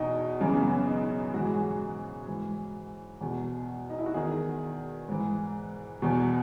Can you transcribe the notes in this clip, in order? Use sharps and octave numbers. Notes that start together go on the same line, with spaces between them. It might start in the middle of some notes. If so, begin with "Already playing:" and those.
Already playing: E2 B2 D#4
F#2 C#3 E3 C#4
B3
C#4
D#4
G#2 E3 F#4
G#4
F#4
G#2 E3
E2 B2
D#4
E4
F#4
E2 D#3 G#4
G#2 E3
E2 B2